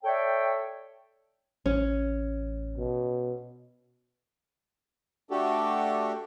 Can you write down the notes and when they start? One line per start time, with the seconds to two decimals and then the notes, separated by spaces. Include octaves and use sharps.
0.04 A4 C#5 D5 E5 G5
1.66 A1 C#4
2.77 B2
5.31 A3 D4 F#4 G4 A4